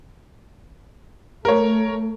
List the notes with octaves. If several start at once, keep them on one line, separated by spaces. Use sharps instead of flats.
A3 A#4 C#5